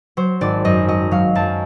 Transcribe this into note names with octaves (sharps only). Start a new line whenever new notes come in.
F#3 C5
G#1 D5
F#2 D#5
F#3 D#5
F#3 F5
F#2 A5